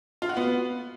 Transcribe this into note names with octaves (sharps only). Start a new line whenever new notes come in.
F4
F#4
B3